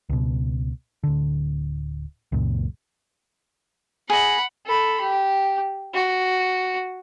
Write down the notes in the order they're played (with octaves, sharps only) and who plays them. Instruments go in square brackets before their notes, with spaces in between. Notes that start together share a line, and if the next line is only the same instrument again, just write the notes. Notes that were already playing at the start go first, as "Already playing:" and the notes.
[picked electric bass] C#2 B2
D1 D3
C#2 F#2 A#2
[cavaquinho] G#4 D#5 [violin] F#5 B5
[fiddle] A4 B5
G4
F#4